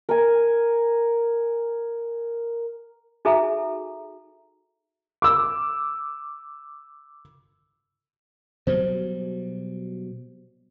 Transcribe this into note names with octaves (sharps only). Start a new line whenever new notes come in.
A#4 G#5
D#4 F#4 G#4 A4 E5 A#5
D6 E6
B2 F#3 G3 C5